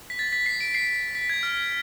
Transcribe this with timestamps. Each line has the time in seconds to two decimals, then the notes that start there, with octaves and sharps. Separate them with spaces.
0.10 B6
0.19 A6
0.33 B6
0.46 C7
0.60 D7
0.75 C7
0.87 C7
1.15 B6
1.30 G#6
1.43 F6